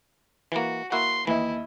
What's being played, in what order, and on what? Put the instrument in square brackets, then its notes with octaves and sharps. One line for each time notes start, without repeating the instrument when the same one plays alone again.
[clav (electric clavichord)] E3 A#3 [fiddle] F#4
[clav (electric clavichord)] A#3 E4 F#4 [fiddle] C6
[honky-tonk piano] D#2 D#5 [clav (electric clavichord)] E3 [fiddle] E4